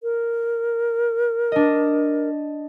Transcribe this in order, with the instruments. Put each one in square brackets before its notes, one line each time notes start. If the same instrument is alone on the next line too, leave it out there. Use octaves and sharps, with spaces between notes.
[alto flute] A#4
[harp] D4 D#5